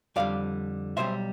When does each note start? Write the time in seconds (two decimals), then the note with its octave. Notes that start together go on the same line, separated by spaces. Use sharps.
0.16 F2 D3 G3 D5 F5
0.97 B1 B2 G3 C5 E5